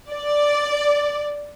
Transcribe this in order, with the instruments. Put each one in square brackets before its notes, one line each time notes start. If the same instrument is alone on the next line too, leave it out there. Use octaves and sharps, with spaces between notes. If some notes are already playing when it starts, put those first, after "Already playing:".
[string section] D5